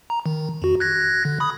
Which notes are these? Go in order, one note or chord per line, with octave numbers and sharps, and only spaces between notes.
A#5
D#3
F2 F#4
F#6 G#6 A#6
D3
B5 D#6